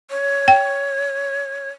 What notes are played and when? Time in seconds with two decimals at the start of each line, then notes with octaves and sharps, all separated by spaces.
0.10 C#5
0.48 G5